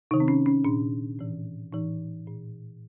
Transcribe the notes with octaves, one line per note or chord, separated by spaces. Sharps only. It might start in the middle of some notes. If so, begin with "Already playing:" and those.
C3 D#3 D#4
C4
C#4
C#4
A#2 D4
A2 E3
A2 E3 D#4
A#2